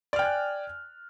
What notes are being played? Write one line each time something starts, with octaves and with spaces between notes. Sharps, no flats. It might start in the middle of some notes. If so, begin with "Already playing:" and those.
D5 G5 G#5 F6 F#6